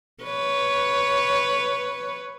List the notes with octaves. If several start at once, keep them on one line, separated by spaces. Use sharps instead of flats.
B4 C#5